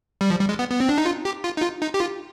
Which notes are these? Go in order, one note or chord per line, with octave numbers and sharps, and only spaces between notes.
G3
F3
G3
G#3
B3
B3
C4
D4
D#4
F4
G4
F4
D#4
F4
D#4
G4
F4